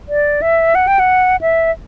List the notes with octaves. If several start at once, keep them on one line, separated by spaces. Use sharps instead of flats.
D5
E5
F#5
G5
F#5
E5